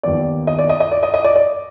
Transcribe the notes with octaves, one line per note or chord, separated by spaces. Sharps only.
D#2 D#3 B3 D5
D#5
D5
D#5
D#5
D5
D#5
D#5
D5
D5